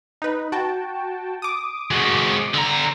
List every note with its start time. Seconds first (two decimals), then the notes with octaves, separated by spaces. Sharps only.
0.22 D#4 B4
0.52 F#4 G5 A5
1.42 D6 D#6
1.91 G#3 F#4
2.54 D3 A#5